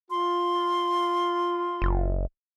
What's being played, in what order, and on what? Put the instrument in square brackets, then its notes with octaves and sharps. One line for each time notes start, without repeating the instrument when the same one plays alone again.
[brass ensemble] F4 [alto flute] C6
[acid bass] F#1